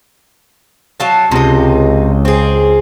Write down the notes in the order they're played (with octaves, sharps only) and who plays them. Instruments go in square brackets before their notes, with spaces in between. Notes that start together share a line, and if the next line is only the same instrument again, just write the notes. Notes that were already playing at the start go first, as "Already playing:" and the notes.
[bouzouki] F#3 F5 A5
[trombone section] C#2 [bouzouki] C3 D#4
[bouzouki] C4 G#4